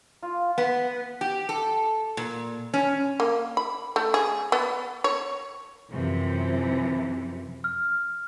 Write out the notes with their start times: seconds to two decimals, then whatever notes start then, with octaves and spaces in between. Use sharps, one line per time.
0.23 F4
0.58 B3
1.21 G4
1.49 A4
2.17 A#2
2.74 C#4
3.20 A#3
3.57 B5
3.96 A3
4.14 G#4
4.52 B3
5.04 C#5
5.91 F#2 C3 E3 F3
7.64 F6